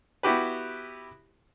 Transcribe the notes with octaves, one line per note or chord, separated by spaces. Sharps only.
B3 E4 F#4 G4 B4